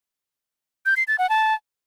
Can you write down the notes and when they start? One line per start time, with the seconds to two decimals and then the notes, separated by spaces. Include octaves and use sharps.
0.86 G6
0.97 C7
1.07 A6
1.18 F#5
1.29 A5